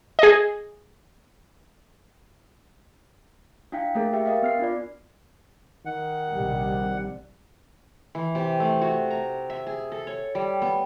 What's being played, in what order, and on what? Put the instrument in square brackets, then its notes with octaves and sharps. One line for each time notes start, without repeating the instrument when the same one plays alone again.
[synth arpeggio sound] G#4 D#5
[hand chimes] D4 E4 F5 G5 B6
A3 A#3 G#4 A#4
G4 E5 G5
A#4 D#5 F5
B3 F6 C7
D4 F4 D5
[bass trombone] D#3 [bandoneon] F#5
[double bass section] A#1 C3 G3
[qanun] E3
C3
A3
F#4
A#5
E5
G#4
A4
C#5
G3
B3